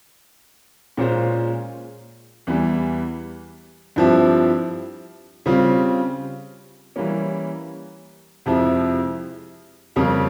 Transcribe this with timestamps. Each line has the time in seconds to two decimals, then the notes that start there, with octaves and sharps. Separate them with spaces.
0.97 A#2 G#3 C#4 F4 C5
2.47 E2 E3 G3
3.96 G2 F3 C4 E4 G4
5.46 C#3 G3 C4 F4
6.96 E3 G3 A#3 C#4
8.46 F2 C3 F3 G#3 E4
9.96 F2 C#3 G3 A#3